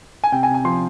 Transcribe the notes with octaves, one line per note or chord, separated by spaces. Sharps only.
G#5
C3 G5
G#5
C3
G#5
F3 C6